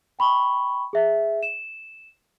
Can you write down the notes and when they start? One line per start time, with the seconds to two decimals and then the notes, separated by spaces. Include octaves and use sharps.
0.19 G5 B5 C#6
0.93 G#4 E5
1.43 E7